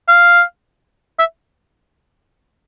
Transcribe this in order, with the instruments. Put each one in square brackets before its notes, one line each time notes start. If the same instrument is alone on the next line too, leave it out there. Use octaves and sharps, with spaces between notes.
[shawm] F5
E5